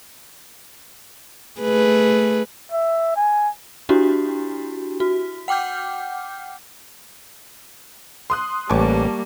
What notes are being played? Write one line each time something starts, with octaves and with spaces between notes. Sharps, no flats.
A3 G#4 B4
E5
G#5
D4 E4 F#4 G4
F#4
F#5 G5 D6 F6 G6
C6 D#6 F#6
A1 G3 A#3 G#5 A5 C#6 D6